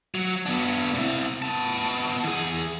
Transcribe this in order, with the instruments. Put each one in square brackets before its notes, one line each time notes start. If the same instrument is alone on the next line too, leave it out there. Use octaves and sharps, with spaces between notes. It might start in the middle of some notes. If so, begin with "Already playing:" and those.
[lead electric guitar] F#3
B3 D4
C3 E4
B3 A5
E3 G#4